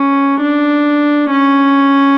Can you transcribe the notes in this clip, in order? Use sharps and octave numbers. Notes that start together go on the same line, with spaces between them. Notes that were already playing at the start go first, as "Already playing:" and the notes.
Already playing: C#4
D4
C#4